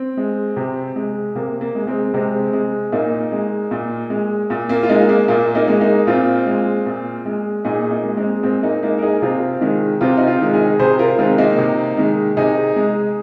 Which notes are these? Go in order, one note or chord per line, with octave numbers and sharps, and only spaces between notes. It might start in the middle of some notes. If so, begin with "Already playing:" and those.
Already playing: C4
G#3
C3
G#3
C3 A#3
A#3
G#3
G#3 C4
C3 G#3 C4
G#3
A#2 A#3 D#4
G#3
A#2
G#3
A#2
A#3
F4
G#3 A#3 D#4
A#3
A#2 A#3
A#3 D#4
G#3
A#3 D#4
A#2 C4 F4
G#3
A#2
G#3
A#2 D#4 G#4
A#3 D#4
G#3
G#3 C4
A#2 G#3 C4
A#3 D#4
G#3 A#3 D#4
A#4
D#4 G#4
C3 C4 F4
D#3 G#3
C3 C4 F4
D#4
C4 F4
D#3 G#3
D#4 G#4
C3 G#4 C5
F4 A#4
D#3 G#3 C4 F4
A#3 D#4
C3
D#3 G#3
C3 D#4 G#4
G#3